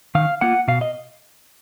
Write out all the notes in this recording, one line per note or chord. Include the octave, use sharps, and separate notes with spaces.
D#3 F5
A#3 F4 F#5
B2 F5
D#5